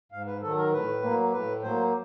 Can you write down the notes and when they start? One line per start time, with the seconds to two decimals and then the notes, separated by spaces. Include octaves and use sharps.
0.12 G#2 F5
0.27 B4
0.42 D#3 F#3 A4
0.58 A#4
0.72 A2 B4
1.02 F#3 A#3
1.32 A2 B4
1.62 F#3 A#3 C5